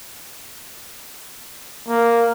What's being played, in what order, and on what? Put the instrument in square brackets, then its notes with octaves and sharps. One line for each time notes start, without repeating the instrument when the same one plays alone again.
[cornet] A#3